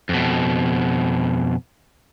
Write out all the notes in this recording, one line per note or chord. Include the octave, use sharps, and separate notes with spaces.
F2 B2